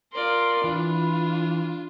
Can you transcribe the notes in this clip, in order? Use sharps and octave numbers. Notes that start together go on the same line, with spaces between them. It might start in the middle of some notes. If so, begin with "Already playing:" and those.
F4 A#4 D5 C6
E3 D4 F4